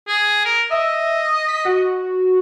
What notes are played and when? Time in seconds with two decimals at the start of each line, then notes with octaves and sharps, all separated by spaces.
0.08 G#4
0.45 A#4
0.71 D#5 E5
1.48 B6
1.65 F#4